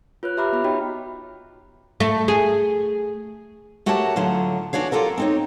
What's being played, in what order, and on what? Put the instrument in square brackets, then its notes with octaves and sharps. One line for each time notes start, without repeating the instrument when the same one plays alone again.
[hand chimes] F4 B4 C#5 F#6
G4 E5 A#5 B5 D6 F6
B3 E5 B5
D#4 F#4 C#5 D#5 G5 B5
[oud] A3
G#4
[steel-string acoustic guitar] A3 F#4 G4 A#4 C#5 A5
A2 D3 F#3 F4
E2 D4 F#4 C#5 F5
F4 G4 A4 A#4 F#5
C4 D#4 C#5